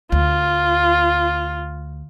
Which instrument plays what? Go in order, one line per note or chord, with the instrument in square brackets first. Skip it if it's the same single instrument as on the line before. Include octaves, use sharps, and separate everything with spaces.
[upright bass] D2 [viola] F4